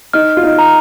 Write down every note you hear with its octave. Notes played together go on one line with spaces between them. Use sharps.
D#4 F6
F4
D#4
A#5